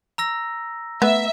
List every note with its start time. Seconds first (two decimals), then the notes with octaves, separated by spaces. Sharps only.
0.18 A#5 E6 A#6
1.02 A3 B3 E5